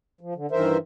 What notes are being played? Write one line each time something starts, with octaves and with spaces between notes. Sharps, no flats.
F3
D3
G2 D#3 E3 A#4 C5 E5